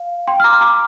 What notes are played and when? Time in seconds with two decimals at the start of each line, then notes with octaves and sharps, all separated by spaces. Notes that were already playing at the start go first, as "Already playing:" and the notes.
Already playing: F5
0.27 G5 C6
0.40 F6
0.44 A#5 D6
0.61 A#5 D6